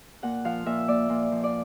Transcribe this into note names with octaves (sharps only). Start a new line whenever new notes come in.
A#2 F#5
F3 F5
A#2 E5
A#3 D5
A#2
F3
D5